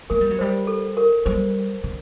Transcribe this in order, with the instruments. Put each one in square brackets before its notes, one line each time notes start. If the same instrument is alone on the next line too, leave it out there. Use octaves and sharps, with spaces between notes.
[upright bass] A3 [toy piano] A#4
[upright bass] G3
F#3
[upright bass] G3 [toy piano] C5
[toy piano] A4
A#4
[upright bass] G3 [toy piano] C5
[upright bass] D3